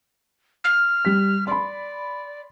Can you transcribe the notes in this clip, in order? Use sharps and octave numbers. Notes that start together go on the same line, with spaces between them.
F6
G3 B6
D5 B5 C6